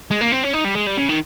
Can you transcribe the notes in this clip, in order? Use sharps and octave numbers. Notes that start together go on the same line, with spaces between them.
G#3
A#3
C4
C#4
D#4
G3
G#3
G3
C#3
D#3